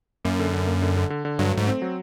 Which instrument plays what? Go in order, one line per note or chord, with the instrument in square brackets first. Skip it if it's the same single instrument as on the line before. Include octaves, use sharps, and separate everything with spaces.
[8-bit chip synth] F#2 [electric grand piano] A#3
[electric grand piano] D3
D3
A#3
D3
D3
D3
D3
[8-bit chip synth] G2 [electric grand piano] F#3
[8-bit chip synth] G#2 [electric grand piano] A3
[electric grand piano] C4
F#3